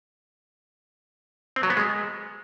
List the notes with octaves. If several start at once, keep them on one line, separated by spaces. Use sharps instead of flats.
C4
F#3
B3
G#3